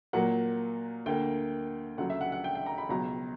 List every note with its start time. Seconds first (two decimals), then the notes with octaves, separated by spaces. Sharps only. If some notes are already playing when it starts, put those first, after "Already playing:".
0.13 A#2 F#3 A#3 F#5
1.06 D2 D3 A#3 G5
1.98 D2 C#3 F#3 F#5
2.10 E5
2.21 F#5
2.32 F#5
2.44 G5
2.55 G5
2.66 A#5
2.78 B5
2.89 C#2 B2 F#3 A#5